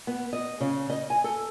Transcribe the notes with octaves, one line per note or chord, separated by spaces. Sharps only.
B3
D#5
C#3
D#5
G#5
A4